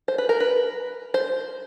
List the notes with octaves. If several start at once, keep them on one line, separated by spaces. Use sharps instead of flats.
C5
B4
A#4
B4
C5